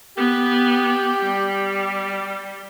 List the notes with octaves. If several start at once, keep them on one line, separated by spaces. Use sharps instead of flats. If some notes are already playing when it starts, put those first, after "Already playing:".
B3 G4
G3